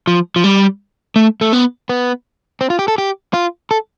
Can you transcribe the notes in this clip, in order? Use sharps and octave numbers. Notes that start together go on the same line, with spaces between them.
F3
F3
G3
A3
A3
B3
B3
C4
F4
G4
A4
G4
F4
A4